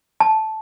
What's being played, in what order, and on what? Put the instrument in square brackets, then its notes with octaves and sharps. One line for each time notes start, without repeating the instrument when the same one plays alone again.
[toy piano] A5